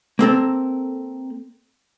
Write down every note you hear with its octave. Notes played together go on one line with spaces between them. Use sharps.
A#3 C4 A4 A#4